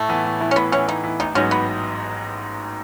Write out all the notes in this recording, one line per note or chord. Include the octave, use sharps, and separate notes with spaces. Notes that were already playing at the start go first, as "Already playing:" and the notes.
Already playing: A2 A3
E3 B3 E4
A2
E3 B3 E4
C#4
A2 B3
E3 B3 C#4 E4
A2 D#4
E3 B3 E4
A1 D#4
G#2 F#3 B3 C#4 D#4
B3